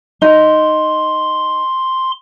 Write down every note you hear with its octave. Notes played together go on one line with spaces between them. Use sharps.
D#4 C6